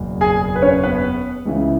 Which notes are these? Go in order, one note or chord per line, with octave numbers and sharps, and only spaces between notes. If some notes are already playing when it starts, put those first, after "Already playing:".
Already playing: F#1 E2 B2
G#4 G#5
B4
C#4 C#5
B3 B4
C#2 C#3 E3